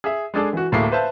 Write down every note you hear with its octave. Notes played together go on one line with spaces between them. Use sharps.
G#4 E5
G#3 D4 G#4 A4
E3 F#4
D1 A2 A#3 E4 G#4 C7
B4 C5 E5 F5 A5